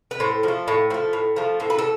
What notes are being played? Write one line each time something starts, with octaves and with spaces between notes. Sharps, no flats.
B4
A2 C5
F3 A3
A2
F3 A3
A2
F3 A3
A2 C5
B4
A4